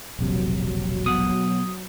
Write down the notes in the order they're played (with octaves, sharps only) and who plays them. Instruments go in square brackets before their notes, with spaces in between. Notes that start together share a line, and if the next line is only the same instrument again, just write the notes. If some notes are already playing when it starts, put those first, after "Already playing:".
[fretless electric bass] E1 A#1 C3 [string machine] F#3
[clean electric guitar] B2 F#5 [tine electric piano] D#6